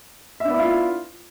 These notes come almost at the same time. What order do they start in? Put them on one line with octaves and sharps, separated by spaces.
E5 D4 B3 E4 F4